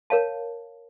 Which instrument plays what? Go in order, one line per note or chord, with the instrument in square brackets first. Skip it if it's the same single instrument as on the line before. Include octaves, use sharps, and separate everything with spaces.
[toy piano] A#4 C#5 F5 A5